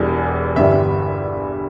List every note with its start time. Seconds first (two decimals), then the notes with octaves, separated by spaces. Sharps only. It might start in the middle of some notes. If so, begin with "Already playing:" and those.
Already playing: E1 E2 E3 G3
0.55 G1 G2 E3 G3 E5